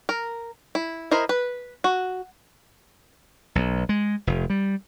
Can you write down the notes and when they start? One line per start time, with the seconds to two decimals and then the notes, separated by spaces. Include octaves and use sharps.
0.09 A#4
0.75 E4
1.11 E4 A#4 C5 D#5
1.29 B4
1.84 F#4
3.55 B1
3.89 G#3
4.27 F1
4.50 G3